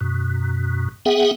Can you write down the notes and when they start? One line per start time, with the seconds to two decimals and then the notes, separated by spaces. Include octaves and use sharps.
0.01 F#2 B2
1.06 B3 G#4 E5 F#5 G5